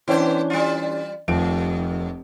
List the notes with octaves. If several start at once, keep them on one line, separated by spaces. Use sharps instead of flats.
E3 B3 C#4 D4 C5
G3 F4
F1 D#2 F3 D7